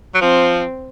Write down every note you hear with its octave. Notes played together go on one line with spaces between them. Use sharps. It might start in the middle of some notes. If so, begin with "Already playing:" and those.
F#3
F3 C4